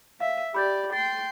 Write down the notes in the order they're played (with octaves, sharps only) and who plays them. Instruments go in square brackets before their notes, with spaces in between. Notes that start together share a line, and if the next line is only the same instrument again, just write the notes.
[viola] E5 [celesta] F5
[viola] G4 D5 [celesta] B5 G6 A6
[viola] G5 C6 [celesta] A6